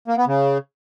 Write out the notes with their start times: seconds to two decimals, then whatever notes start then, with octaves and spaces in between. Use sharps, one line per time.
0.08 A#3
0.18 B3
0.27 C#3